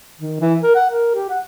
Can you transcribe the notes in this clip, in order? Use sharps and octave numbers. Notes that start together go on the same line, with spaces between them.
D#3
E3
A#4
F#5
A#4
G4
F#5